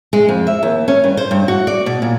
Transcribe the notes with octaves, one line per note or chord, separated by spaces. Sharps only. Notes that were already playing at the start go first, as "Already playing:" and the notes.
G#3
F2
E5
D#2
C#4
G2
C5
G2
F#4
D5
B2
A#2